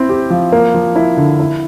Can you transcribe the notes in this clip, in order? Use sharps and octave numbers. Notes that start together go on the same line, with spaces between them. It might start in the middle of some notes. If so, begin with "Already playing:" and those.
Already playing: C4 E4
G4
F3
A#3
F3
E4
D3
E4